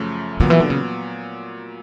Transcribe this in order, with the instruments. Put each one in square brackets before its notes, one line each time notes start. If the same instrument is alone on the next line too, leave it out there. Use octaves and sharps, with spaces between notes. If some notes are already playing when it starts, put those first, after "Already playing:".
Already playing: [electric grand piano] F#2 C#3 F3 A3
[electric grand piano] A#2 F#3 B3 [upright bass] D3
[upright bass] E3
D3
C#3